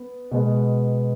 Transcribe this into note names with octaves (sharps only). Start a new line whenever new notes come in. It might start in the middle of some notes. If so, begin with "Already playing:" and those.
Already playing: B3
B2 G#3 B3